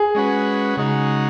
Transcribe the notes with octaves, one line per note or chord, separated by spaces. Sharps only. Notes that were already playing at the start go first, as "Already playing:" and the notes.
Already playing: G#4
G#3 C#4 F#4 B4
C#3 G#3 D#4 F#4